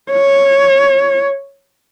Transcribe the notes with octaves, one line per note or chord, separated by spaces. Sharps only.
C#5